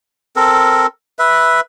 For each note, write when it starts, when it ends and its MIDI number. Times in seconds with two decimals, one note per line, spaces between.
0.36 0.86 60
0.36 0.86 69
0.36 0.86 70
1.19 1.61 71
1.19 1.61 76